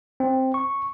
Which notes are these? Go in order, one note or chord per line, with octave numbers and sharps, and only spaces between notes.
C4
C#6